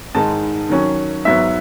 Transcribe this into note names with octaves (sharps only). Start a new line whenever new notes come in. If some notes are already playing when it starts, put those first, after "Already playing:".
G#2 D#3 G#3 D#4 A5
D#3 F#3 C#4
G#2 F#3 B3 E5